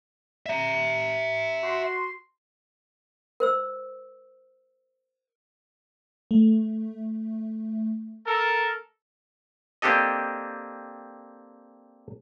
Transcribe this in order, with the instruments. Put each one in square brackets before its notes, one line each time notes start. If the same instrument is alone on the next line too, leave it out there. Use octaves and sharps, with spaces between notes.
[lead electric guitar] E5 A#5
[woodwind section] F#4 C6
[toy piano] A#4 C5 E6
[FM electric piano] A3
[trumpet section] A4 A#4
[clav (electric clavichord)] A#3 C4 D4 G4 A4 D#5